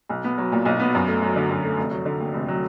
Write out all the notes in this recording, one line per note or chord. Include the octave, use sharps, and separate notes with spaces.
B1
B3
F#3
A#2
B1
B3
F#2
A3
F#3
D3
F#2
A3
F1
F#3
D3
D#2
F1
F#3